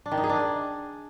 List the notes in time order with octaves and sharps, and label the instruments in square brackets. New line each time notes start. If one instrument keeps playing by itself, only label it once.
[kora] D4
D#3
D#4
G#4
D4